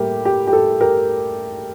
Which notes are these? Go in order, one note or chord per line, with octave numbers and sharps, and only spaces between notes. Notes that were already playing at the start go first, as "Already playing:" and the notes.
Already playing: A2 G3 A#3 G4 A#4
G4
G4
A4
G4 A#4